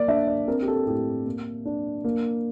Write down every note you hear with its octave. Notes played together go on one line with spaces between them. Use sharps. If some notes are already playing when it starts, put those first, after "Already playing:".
Already playing: A#3 D5
D4 E5
D5
C4 A#4
G4
A4
A2 G4
A#3
D4
A#3